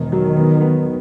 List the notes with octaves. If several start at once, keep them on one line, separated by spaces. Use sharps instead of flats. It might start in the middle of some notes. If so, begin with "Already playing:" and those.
Already playing: E1 D#3
F#3
B3
B3